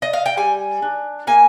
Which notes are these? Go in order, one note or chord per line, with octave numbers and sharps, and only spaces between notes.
D#5
F5
G5
G3 G#5
D4
A#3 G#5